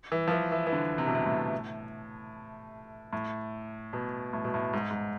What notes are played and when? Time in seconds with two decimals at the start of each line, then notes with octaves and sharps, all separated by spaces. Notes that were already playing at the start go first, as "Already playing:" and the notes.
0.12 E3
0.28 F3
0.31 E3
0.52 E3
0.67 E3
0.72 D3
0.98 C3
1.07 B2
1.15 C3
1.26 A2
3.13 A2
3.93 B2
4.33 A2
4.44 B2
4.54 A2
4.73 G#2
4.91 G#2